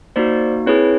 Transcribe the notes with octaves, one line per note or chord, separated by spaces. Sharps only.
A#3 D#4 F#4 C5 D5
C4 E4 G#4 B4 C#5